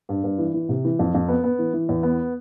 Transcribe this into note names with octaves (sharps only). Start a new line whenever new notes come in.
G2
G2
E3
E3
C3
E3
F2
F2
B3
B3
E3
E3
E2
B3